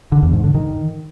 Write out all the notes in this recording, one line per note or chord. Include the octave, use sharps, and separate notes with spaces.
D3
E2
G#2
D3
D#3